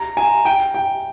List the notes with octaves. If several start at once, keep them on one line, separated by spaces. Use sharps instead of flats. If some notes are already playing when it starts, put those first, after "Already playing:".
Already playing: A#5
G#5
G5
G5